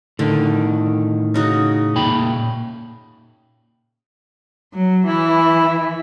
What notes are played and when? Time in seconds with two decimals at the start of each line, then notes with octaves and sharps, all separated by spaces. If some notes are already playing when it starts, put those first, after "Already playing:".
0.19 A2 D3 D#3
1.34 C#3 D#4 F#4
1.95 A#2 G5 B5
4.74 F#3
5.07 E3 E4